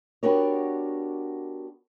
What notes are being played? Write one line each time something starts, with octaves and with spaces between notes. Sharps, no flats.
B3 D4 F#4 G4 A#4 C#5